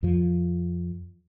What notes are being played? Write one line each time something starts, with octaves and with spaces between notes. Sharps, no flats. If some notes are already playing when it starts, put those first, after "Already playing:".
F2 F3